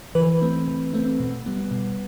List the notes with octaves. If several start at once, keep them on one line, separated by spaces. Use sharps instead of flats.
E3 B4
A3 C4
E3
A3 C4
B2
G3 B3
B2